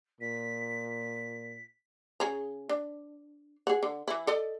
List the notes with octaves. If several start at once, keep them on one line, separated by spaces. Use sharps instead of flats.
A#2 B6
C#3 G#4 A#5
D4
G#4 F#5
D3
E3 E4
A4 D5 D#5